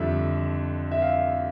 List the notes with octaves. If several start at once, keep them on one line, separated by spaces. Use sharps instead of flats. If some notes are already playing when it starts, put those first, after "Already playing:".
Already playing: F2 D3 G3 E5
E5
F5